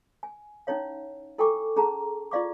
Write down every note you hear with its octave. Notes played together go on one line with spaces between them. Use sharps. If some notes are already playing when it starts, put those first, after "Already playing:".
G#5
C#4 D#4 E4 C#5 F5
E4 A4 G5 G#5 C#6 D6
C#4 G#4 A5 A#5
E4 F4 D5 F5 C#6 D6